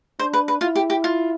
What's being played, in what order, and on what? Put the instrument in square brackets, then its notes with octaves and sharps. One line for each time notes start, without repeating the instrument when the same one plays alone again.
[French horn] D4 [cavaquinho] C5
[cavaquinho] B4
B4
[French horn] E4 [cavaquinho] F4
[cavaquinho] G4
G4
F4